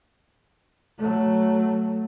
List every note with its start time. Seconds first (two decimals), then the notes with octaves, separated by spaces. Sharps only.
0.99 F#3 A3